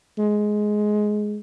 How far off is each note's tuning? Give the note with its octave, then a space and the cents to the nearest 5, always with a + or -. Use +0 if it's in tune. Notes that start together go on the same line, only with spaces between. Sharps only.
G#3 +10